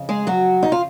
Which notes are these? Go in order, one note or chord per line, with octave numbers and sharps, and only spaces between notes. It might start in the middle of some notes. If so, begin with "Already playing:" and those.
Already playing: F2 C#3
G#3 G#4
F#3 F#4
D#4
F4